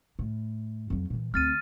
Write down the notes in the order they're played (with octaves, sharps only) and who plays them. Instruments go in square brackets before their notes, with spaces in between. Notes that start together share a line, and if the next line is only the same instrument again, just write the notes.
[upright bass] A2
F2 F#3
A#2 E3
[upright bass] D2 C4 [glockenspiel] F6 A6 D#7